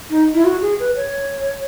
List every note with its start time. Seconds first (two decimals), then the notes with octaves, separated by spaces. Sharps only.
0.10 D#4
0.34 E4
0.45 F#4
0.62 G#4
0.80 B4
0.96 C#5